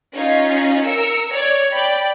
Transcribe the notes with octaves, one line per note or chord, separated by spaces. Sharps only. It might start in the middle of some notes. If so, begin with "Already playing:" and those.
C#4 D#4 F4
A#4 E6 C#7
C#5 D5
D5 G5 B5